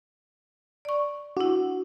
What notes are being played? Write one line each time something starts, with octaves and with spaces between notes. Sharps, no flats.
D5 C#6
D4 E4 F#4